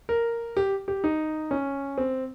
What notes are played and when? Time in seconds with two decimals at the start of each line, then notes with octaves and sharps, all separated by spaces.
0.09 A#4
0.57 G4
0.88 G4
1.04 D#4
1.51 C#4
1.98 C4